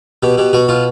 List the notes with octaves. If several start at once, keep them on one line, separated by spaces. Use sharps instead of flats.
B2 G4
B2 G4
B2 F#4
B2 F4